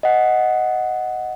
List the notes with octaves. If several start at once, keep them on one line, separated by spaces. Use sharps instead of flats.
D#5 F#5